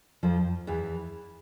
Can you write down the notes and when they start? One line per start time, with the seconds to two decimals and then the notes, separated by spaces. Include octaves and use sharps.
0.23 F2 F3
0.67 E2 E3